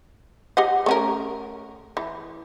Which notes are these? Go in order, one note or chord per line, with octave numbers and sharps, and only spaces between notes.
G4 D#5 F#5
A3 C#4 A#4
E3